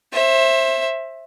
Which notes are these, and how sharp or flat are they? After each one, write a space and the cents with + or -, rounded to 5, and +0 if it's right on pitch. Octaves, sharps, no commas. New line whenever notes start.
C5 +30 E5 +0